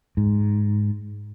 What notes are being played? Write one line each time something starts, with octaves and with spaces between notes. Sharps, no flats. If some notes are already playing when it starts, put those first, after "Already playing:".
G#2